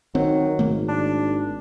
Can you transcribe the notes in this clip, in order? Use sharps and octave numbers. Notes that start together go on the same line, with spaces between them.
D#3 F#3 C4
G#1 D#3 A3 A#3
D4